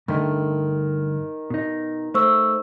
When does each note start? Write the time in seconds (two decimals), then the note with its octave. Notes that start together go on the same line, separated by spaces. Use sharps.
0.08 G2 D3 D#3 A3
1.50 B2 D#4
2.14 A3 C5 C#6 E6